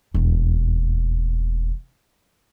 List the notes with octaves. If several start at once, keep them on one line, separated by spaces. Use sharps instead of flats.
E1 D#2